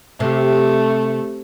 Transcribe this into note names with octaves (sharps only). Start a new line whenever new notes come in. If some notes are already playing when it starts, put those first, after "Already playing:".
C3 A3